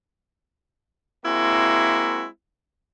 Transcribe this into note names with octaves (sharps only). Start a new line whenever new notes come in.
G#3 A#3 C4 E4 F#4 E5